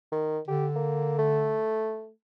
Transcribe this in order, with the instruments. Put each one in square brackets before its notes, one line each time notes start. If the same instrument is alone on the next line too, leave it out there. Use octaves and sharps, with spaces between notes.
[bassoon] D#3
[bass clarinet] D3 [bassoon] G4
[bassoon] A#3
A3